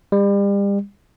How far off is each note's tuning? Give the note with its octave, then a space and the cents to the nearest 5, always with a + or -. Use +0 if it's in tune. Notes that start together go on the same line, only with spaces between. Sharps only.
G3 +35